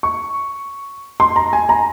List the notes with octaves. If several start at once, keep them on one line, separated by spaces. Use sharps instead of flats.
C#6
C6
A#5
G#5
A#5